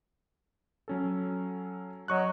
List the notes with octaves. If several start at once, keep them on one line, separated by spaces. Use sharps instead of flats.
F#3 C#4 A4
F#3 D#5 C#6 F#6